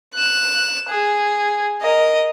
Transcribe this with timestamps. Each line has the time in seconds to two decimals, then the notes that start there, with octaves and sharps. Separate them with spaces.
0.15 F#6 E7
0.89 G#4
1.82 A#4 D#5